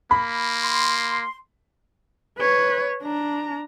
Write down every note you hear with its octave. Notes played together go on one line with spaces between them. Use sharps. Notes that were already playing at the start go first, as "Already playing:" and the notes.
A#3 B5
C6
B4 C#5
D4 A#5